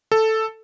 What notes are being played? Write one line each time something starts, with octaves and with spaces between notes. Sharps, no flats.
A4